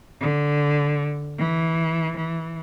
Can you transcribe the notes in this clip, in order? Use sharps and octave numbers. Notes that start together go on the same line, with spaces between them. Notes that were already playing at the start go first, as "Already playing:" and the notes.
D3
E3
E3